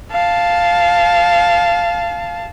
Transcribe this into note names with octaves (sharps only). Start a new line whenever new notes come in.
F5 A5